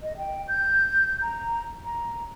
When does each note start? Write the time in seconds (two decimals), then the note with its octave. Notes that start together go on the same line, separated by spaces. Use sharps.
0.03 D#5
0.18 G5
0.48 G6
1.22 A#5
1.85 A#5